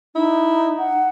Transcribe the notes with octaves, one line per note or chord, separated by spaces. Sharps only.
D#4 E4
F#5